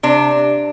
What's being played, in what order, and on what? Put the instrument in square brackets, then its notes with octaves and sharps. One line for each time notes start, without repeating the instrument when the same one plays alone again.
[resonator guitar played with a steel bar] C3 D4